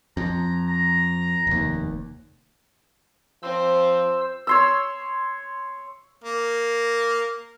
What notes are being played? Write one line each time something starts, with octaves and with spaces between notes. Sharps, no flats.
F2 A#5
A#5
F1 D#2
F3 C4 C5 E6
C#5 C6 E6
A#3